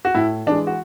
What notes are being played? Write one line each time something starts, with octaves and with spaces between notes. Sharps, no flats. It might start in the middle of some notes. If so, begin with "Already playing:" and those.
F#4
A2 E4
E3 G#3 D4
F#4